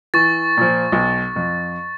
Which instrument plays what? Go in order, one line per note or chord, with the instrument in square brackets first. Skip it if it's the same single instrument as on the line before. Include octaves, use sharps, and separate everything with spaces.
[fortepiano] E3 [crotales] C#6 A6
[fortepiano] A#2 F3
B1
F2